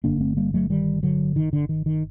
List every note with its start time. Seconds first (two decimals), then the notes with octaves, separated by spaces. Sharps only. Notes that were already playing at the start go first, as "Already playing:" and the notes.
0.04 G1 F#2 D3 A#3 D4
0.21 A3 C4
0.37 G3 A#3
0.54 F#3 A3
0.70 D#3 G3
1.03 D3 F#3
1.36 D#3
1.53 D3
1.69 D#3
1.86 D#3